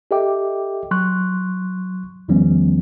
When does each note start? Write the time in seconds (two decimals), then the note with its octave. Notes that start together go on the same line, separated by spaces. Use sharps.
0.11 G4 A4 D#5 E5 G5 D6
0.91 F#3 C6 C#6 F#6
2.28 E2 D#3 F3 G3 B3 C#4